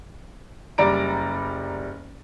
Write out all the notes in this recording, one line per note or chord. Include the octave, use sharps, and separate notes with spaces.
F#1 G3 D5 A#5 D7